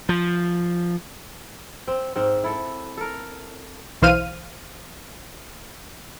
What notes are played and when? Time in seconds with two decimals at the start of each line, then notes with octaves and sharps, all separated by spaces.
0.09 F3
1.88 C4
2.16 G#2 C4
2.44 E4 A4
2.97 A4 A#4
4.02 B1 E3 C5 F5 F6 D#7